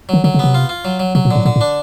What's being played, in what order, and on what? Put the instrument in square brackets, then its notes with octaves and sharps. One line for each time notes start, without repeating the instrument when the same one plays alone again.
[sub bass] D#3 [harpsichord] F#3
[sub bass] D3 [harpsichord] F#3
[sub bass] C#3
[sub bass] C3 [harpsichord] B3
[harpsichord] F4
F4
F#3
F#3
[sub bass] C3 [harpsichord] F#3
[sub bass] A#2
[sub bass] A2 [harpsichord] D3
[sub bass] A#2 [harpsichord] D3
[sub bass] A2
[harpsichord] D4